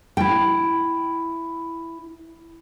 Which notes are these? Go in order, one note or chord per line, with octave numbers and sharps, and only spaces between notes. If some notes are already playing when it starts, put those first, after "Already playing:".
E4 G5